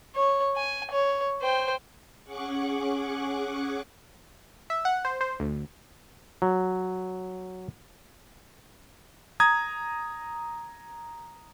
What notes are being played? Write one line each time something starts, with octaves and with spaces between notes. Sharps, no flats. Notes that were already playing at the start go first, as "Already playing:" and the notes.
C#5
G#5
C#5
C5 G5
C#4 G#4 F#5 C#6 D6 F#6
E5
F#5
C5
C5
D2
F#3
A#5 D#6 G#6